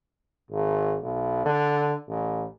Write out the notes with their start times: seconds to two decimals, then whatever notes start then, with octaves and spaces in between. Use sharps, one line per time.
0.51 G#1
1.03 B1
1.45 D3
2.09 A1